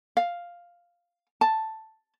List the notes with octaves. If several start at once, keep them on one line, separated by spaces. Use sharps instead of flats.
F5
A5